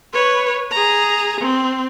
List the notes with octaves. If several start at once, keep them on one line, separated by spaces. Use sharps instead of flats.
B4 C#5
G#4 A#5
C4